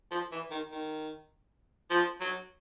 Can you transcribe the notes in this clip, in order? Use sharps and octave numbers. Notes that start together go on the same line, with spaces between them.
F3
E3
D#3
D#3
F3
F#3